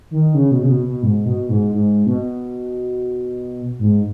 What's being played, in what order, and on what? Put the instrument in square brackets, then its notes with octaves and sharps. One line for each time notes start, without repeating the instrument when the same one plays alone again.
[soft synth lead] D#3
C#3
B2
C#3
B2
B2
G#2
B2
G#2
G#2
B2
G#2